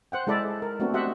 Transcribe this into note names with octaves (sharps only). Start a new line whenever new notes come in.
C5 F#5 G5
G#3 E4 A4 D5 B5
A#4
A3 B3 C4 D4 F#4
F#4 G4 C5 D#5 E5 F#5